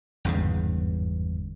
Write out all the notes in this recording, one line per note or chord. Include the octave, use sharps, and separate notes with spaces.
G1 E2 G#2 C#3